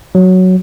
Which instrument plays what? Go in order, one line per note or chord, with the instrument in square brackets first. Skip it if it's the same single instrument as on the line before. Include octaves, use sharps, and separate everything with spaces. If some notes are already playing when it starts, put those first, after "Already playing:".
[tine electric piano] F#3